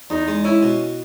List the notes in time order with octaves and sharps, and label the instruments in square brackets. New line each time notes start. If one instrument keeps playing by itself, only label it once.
[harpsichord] E2 [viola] D#4
[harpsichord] G#3
[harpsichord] C#4 [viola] E4
[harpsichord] B2